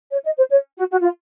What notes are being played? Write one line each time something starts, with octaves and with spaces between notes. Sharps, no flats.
C#5
D#5
C5
C#5
F#4
F#4
F4